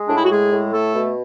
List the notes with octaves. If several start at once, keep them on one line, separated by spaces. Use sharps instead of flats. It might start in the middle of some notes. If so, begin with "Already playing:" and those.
Already playing: G#3
A2 D4
E4
F#4
G#3 G#4
A2
A3 A4
B2